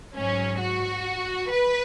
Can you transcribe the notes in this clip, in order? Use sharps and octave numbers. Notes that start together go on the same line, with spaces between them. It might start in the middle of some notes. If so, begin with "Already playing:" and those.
G#2 F#3 C#4
F#4
B4